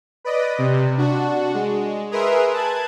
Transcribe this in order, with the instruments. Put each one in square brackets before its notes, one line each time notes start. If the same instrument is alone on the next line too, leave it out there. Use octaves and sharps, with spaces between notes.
[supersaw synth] B4 D5 D#5
C3
D4 F#4
G#3
G#4 A#4 B4 E5 C6
A5 F#6 G#6